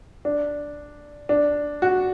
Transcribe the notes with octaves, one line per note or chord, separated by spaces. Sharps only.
D4
D4
F#4